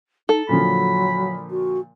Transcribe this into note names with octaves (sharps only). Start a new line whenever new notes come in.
D#4 A4
A#2 D3 F3 F#3 B5
F#4